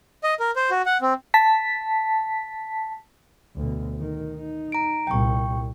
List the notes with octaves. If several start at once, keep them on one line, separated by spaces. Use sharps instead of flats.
D#5
A#4
C5
F#4
F#5
C4
A5 B6
D2 B2
D#3
D#4
A#5 D7
C2 A#2 G5 C#6